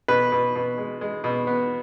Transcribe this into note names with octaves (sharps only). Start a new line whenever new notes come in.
B2 B4
B2
B2
G#3
G#3
B2
B3